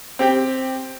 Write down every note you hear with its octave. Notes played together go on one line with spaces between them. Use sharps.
C4 G4 G5